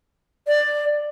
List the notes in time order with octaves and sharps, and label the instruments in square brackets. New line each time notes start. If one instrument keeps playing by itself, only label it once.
[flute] D5